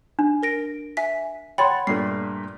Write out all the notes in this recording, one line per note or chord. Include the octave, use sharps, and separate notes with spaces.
D4
A#4 A#6 D7
E5 G#5 B6
C#5 F#5 G5 B5 C6 A6
G2 A#2 A3 C7